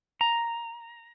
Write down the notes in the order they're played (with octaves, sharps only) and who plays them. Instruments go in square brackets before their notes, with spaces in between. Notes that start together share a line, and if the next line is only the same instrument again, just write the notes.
[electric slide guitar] A#5